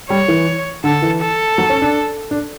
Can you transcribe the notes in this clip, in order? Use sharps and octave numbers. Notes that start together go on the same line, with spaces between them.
G3 C#5
E3
D3 A4
E3
A4
F#3
C#4
D4
D4